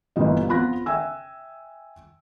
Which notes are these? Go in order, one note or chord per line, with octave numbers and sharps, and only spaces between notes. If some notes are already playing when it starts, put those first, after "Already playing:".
G1 A#2 D3 E3 G3 D#5
F2 B3 F4 B5 F#6 A#6
E5 G5 G#5 E6